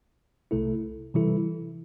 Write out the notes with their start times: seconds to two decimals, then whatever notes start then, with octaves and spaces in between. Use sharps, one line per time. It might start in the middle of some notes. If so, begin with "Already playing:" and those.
0.51 C2 C3 A3 E4 A4
1.14 C3 E3 G3 E4 A4